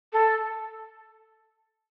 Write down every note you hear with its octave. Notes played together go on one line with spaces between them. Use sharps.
A4